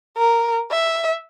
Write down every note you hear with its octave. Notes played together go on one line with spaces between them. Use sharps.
A#4
E5